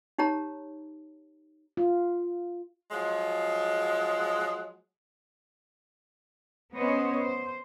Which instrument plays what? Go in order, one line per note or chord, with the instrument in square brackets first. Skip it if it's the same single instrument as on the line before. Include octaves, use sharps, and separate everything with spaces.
[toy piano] D#4 G4 C#5 A#5
[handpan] F4
[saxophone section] F3 F#3 G#3
[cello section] B3 C#4 C5 C#5 D#5
C5